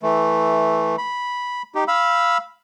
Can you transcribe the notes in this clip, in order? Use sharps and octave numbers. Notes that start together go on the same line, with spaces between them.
E3 A3
B5
D#4 G4
F5 B5 E6